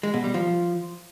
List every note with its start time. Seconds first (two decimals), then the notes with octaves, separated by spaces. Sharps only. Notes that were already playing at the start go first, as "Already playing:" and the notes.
0.03 G#3
0.14 B2
0.24 G3
0.34 F3